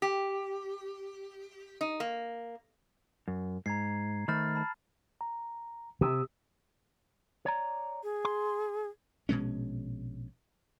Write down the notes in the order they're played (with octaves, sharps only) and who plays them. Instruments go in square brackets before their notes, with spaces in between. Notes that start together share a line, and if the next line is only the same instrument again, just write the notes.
[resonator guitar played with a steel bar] G4
D#4
A#3
[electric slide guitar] F#2
[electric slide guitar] G#2 [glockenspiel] A#5 G#6 C7
[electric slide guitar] D#3 A3 C5 [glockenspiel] B5 F6 A6
[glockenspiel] A5 B5
[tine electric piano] A#5
[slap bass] C3 [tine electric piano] G4 D#6 E6
[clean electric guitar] C#5 D5 A#5
[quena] G#4
[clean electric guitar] C6
[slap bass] A#1 B2 G#3 C#4